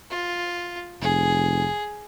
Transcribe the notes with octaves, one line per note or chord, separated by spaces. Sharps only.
F4
F1 G#4